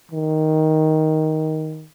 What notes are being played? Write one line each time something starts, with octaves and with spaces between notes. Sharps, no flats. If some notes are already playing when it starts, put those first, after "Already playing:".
D#3